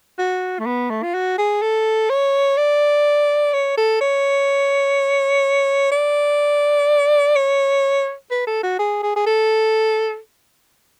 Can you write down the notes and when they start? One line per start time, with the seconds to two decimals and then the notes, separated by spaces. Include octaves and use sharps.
0.18 F#4
0.59 A3
0.66 B3
0.90 A3
1.03 F4
1.14 F#4
1.38 G#4
1.62 A4
2.09 C#5
2.57 D5
3.53 C#5
3.77 A4
4.01 C#5
5.91 D5
7.35 C#5
8.31 B4
8.47 A4
8.63 F#4
8.79 G#4
9.03 G#4
9.16 G#4
9.26 A4